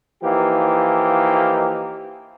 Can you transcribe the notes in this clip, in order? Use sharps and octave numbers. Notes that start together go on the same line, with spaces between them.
E3 F3 A#3 D#4 G4